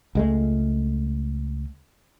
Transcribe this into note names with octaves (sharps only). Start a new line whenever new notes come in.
C#2 G#3 A3